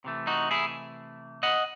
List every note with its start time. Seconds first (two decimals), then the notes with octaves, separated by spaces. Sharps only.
0.05 C3 E3 A3
0.27 D#4 F#4
0.51 E4 G#4
1.43 D#5 F#5